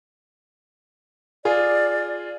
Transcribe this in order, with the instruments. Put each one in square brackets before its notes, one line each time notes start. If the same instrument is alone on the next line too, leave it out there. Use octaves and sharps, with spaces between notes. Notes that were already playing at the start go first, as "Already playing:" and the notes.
[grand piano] F4 G#4 [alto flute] D5